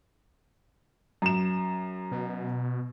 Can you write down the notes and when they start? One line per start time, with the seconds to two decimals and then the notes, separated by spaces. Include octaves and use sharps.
1.22 F#2 E7
2.12 B2